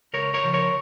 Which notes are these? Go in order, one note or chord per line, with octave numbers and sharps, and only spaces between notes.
C#2 A#4 C#5
A#4 C#5
C#3 F3
A#4 C#5